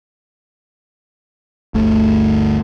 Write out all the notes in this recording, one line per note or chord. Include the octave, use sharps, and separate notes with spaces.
G1 D2 A3